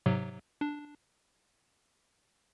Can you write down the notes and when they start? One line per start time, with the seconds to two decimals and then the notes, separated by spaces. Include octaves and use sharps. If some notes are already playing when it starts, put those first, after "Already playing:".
0.06 G#2 C3 F#3
0.61 D4